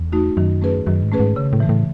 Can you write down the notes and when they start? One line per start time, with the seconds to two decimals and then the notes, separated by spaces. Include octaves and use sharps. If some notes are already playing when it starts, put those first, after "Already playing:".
Already playing: E2
0.12 A3 D#4 F#4
0.37 F#2 D#3
0.62 A3 C#4 G#4 B4
0.86 F#2 D#3
1.03 G#2
1.12 A3 C#4 G#4 B4
1.20 G#2
1.36 C#3
1.53 A2
1.60 E3 A3
1.69 A2